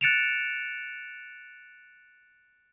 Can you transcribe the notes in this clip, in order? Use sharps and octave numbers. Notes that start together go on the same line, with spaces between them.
F#6 A6 C#7 D7 E7 F7